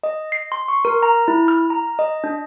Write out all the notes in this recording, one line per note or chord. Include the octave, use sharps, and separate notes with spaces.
D#5
C7
C6
C#6
A#4
A#5
E4
F6
A#5
D#5
D4